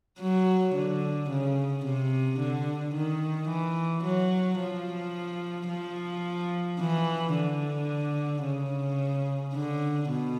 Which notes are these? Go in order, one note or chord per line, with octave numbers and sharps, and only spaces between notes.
F#3
D3
C#3
C3
D3
D#3
E3
F#3
F3
F3
E3
D3
C#3
D3
B2